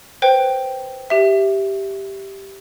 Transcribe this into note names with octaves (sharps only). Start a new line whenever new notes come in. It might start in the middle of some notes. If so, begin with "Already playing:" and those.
B4 C5 G5
G4 E5